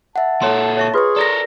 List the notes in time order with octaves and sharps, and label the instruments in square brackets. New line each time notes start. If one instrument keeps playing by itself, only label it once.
[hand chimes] E5 F#5 [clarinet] A5
[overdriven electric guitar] A#2 A4 [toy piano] C#5 A#5 C6
[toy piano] C#5 E5 C#6
[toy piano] F4 B4 [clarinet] G#4 [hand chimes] C6 C#6
[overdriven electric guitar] A4 A#4 [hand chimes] D5 A#6